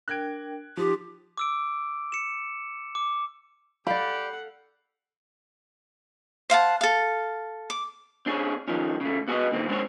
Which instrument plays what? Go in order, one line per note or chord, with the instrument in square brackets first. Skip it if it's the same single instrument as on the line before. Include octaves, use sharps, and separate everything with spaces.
[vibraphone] D4 A#4 G5 [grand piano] F#6 G#6 D7
[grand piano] F3 [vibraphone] D#4 C6 [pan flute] G4
[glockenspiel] D6 E6 D7
C#7 E7
D6
[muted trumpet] G4 [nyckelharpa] A4 F#5 [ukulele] D5 B5 [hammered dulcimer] F5
[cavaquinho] C5 F5 F#5 A5
A4 F5
D6
[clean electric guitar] C4 D4 G#4 C#5
F2 D#3 F3 C#4
C#3 A3
B3 F#4 G#4 A4 B4 D#5
A#2 D3 D#3 C4
G#3 C4 D4 G4 C5 C#5